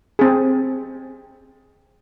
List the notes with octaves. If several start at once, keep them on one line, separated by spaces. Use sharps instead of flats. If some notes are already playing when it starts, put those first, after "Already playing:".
C4 G#4